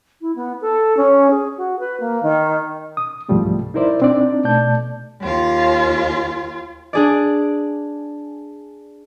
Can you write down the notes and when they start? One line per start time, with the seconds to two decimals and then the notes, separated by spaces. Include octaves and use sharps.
0.21 E4
0.35 B3
0.61 A4
0.97 C#4
1.31 G#4
1.57 F#4
1.79 B4
2.00 A#3
2.23 D#3
2.97 D#6
3.29 C2 G#2 F3 G3 A3
3.74 D#4 E4 A#4 C5 D5 E5
4.02 C4 D4 D#4 D5
4.44 B2 A3 D5 A5 G6
5.21 D#2 F4
6.93 D4 G#4 D5